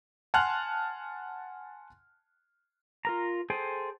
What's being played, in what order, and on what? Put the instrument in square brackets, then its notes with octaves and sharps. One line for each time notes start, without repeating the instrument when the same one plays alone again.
[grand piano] F#5 G#5 A5 C6 F6 F#6
[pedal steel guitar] F4 A#4 A#5
G#4 A4 C5 G5 G#5